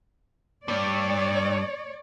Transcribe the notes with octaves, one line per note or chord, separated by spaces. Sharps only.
G2 C#5 D5